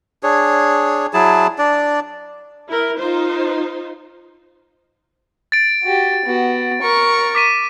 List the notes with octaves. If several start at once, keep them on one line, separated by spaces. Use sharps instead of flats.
D4 G#4 C#5
F#3 E4 G#4 A5
D4 D5
E4 A#4
D#4 F4 C5
A6 D7
F#4 G4
B3 F#4
A#4 C#6
D6 B6 D#7